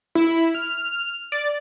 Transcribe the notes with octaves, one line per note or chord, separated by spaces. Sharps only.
E4
F6
D5